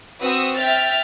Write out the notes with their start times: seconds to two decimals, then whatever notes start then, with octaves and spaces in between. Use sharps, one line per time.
0.22 C4 F#4 B4 D#6 E6
0.59 E5 G5 F6 A6